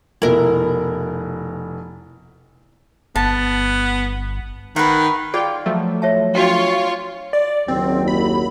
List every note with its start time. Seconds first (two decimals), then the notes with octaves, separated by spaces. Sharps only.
0.22 F1 B2 E4 A#4
3.15 G1 B3 A5
4.76 D#3 B4 F#5
5.34 F4 G#4 D5 G5
5.66 F3 F#3 A3
6.02 C#5 E5 A5
6.35 D4 F4 F#4 C#5 G5
7.33 D5
7.68 F#1 D#2 F#3 C4
8.08 B5